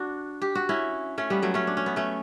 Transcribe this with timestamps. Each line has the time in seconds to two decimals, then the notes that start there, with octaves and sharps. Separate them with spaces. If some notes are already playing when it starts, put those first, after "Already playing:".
Already playing: D4 F#4
0.42 G4
0.55 F#4
0.69 C#4 E4
1.18 A3 C#4
1.30 G3 B3
1.42 F#3 A3
1.54 A3 C#4
1.67 D4
1.77 C#4
1.86 B3
1.96 A3 C#4